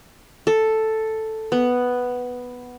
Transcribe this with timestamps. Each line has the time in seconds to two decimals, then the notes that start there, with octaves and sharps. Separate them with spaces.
0.47 A4
1.52 B3